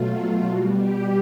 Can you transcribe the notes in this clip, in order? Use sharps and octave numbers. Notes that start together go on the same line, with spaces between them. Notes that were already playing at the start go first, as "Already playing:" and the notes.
Already playing: B2 F#3 A3 F4
B2 G3 F#4
G4